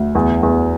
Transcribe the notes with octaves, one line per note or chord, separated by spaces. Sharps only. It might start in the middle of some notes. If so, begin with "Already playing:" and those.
Already playing: D2
E2
E2